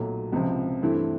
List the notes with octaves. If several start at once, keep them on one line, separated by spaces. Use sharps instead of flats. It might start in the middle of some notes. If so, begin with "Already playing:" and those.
Already playing: B1 A#2 F#3 A3
C#2 C3 F3
G2 E3 A3 C4 E4